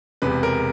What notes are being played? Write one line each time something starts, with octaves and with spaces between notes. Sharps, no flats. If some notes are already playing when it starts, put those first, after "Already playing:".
E1 E2 C3 B4
A#4